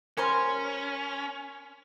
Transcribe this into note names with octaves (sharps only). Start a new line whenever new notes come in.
G3 C#4 A#4 C5 G#5 A#5 C6